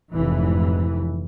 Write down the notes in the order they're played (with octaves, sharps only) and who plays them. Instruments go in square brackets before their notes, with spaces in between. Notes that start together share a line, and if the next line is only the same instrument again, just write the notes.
[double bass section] F1 G#2 E3